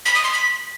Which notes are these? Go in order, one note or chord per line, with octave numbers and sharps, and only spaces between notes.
B6
D#6
C6
B6